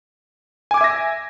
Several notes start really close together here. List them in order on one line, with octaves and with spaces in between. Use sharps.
G#5 D6 G#6 E5 A#6